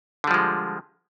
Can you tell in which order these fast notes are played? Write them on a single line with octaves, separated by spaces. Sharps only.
D3 G3 F3 G#3